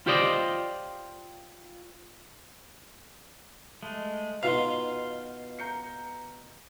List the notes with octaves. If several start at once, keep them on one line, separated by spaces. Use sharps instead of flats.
F4 G4 C5 D5 D#5
G#3 A3
B2 D#4 F4 F5 C6
A#5 G6 C#7